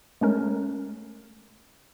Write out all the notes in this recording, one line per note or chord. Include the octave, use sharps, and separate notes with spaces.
G#3 A3 C#4 A#4